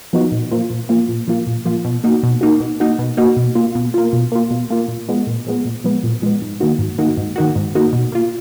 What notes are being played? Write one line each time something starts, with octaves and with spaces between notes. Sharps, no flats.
F3 B3 D#4 F#4
A#2
F3 A#3 F4
A#2
F3 A#3 F4
A#2
F3 A#3 F4
A#2
F3 A#3 F4
B2
A#3 D#4 F#4
B2
A#3 D#4 F#4
B2
A#3 D#4 F#4
B2
A#3 D#4 F#4
B2
A#3 F4
B2
A#3 F4
B2
A#3 F4
B2
A#3 F4
A#2
F3 G#3 B3
A#2
F3 G#3 B3
A#2
F3 G#3 B3
A#2
F3 G#3 B3
G#2
D#3 A#3 D#4 F#4
G#2
D#3 A#3 D#4 F#4
G#2
D#3 A#3 D#4 F#4
G#2
D#3 A#3 D#4 F#4
B2
A#3 F4